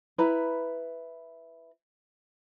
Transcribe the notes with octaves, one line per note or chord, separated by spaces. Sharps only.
E4 B4 A#5